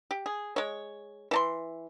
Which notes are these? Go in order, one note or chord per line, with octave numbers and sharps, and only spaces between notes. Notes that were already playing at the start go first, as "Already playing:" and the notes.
G4
G#4
G#3 C#5
E3 A5 C6